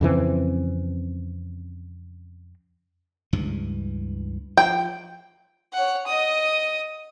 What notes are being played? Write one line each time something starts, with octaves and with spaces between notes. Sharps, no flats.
F2 C#3 E3 C4
C#2 G2 E3
F3 G5
C#5 F#5
D#5 D#6